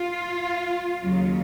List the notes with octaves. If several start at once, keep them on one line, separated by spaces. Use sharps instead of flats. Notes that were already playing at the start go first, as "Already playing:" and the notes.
Already playing: F4
D#2 C#3 F#3